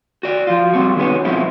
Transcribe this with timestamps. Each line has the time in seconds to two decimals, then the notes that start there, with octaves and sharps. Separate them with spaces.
0.23 F#4 D5
0.47 F3 F4
0.73 C3 G3 C4 F#4
0.97 D#3 G#3 B3 C#4
1.25 B2 F3 G#3 C4 E4